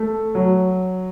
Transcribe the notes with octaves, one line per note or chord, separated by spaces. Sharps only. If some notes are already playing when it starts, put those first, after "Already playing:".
Already playing: A3
F#3